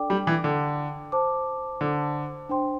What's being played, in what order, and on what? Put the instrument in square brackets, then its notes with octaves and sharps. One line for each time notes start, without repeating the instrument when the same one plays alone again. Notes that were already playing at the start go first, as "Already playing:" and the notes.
Already playing: [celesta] D4 A4 D5 G5 D6
[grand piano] G3
E3
D3
[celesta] C5 A5 D6
[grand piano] D3
[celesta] D4 C5 G5 C6